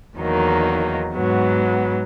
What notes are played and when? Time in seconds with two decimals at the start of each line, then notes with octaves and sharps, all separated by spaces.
0.17 E2 D#3 F#3 A#3 D#4
1.15 G#2 F#3 B3